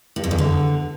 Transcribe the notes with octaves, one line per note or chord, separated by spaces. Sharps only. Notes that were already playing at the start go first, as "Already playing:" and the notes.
G2
F2
E2
D3